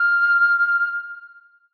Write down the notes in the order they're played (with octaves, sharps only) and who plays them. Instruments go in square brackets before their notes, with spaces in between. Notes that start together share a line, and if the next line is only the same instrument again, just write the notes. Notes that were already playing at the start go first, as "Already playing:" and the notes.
Already playing: [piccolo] F6